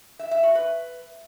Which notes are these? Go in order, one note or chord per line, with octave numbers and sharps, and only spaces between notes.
E5
E5
F#4
B4